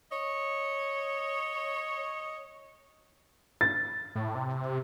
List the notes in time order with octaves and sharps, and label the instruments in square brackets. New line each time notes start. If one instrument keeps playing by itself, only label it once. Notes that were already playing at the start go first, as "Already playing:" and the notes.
[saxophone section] C#5 D#5
[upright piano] A6
[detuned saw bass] A2
C3